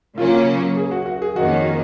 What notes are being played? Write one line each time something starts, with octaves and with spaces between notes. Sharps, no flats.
C#3 F#3 A#3 C#4 F4
G#4
F#4
F#4
G#4
F2 D#3 A#3 C#4 F#4